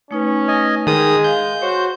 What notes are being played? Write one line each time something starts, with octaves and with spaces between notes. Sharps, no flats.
A3 C#4 D#4 B4
D#5 G#5
D#3 G#3 G#4 D#6
D#5 F5 G#5 G6
F#4 C5 C#5